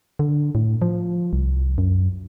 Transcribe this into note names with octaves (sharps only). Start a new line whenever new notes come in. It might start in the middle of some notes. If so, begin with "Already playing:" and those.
D3
A2
F3
C2
F#2